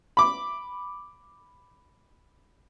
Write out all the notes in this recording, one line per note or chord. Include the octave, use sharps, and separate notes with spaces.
B5 D6